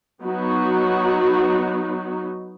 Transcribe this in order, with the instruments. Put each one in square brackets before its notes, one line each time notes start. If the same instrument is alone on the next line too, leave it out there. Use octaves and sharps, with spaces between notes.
[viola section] F#3 B3 D#4 F#4